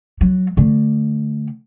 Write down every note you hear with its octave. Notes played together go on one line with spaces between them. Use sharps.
F#3
D3 A3